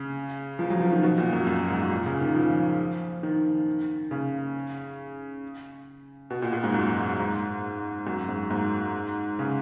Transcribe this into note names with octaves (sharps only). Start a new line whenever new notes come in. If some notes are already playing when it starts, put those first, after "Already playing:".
Already playing: C#3
F3
F#3
F3
D#3
B2
A#2
F#2
F#2
G#2
A#2
C#3
D#3
F3
D#3
C#3
B2
A#2
A#2
G#2
F#2
G#2
F#2
G#2
G#2
C#3